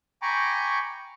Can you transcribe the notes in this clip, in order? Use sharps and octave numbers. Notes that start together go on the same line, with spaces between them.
G5 G#5 A#5 B5 C#6 D6